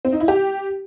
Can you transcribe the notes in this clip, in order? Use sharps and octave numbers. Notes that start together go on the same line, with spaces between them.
C4
D#4
E4
G4